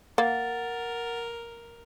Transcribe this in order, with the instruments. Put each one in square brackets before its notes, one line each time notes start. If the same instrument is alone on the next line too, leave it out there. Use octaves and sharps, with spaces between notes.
[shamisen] A#3 [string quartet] A#4 [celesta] F#5 A6